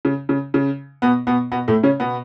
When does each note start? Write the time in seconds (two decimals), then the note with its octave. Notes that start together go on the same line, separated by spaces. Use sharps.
0.05 C#3
0.29 C#3
0.54 C#3
1.02 B2 B3
1.27 B2 B3
1.52 B2 B3
1.68 A2 A3
1.83 C#3 C#4
2.00 B2 B3